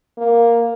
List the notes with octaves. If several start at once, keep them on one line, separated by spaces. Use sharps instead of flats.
A#3